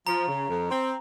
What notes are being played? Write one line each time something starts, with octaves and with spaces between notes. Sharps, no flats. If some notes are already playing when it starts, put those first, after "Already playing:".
F3 A#5
C#3
F2
C4